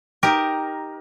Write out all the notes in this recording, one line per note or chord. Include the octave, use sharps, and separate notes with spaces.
D#4 G4 A#4